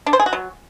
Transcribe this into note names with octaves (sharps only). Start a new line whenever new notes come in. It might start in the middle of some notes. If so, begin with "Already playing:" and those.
D4
C5
G#4
F#4
F#3